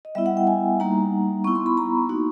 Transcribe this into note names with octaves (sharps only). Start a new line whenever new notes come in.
D#5
G3 B3 E4 E5
F#5
G5
G#5
G3 A#3 D#4 A#5
B3 E4 C#6
C6
B5
A#5
A#3 D#4 F#4